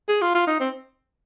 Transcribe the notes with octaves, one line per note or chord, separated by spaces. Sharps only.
G#4
F4
F4
D#4
C4